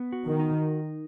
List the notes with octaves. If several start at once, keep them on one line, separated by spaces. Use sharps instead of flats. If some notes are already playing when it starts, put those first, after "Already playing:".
Already playing: B3
F#4
D#3
D#4